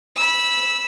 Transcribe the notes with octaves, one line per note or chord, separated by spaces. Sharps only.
B5 E6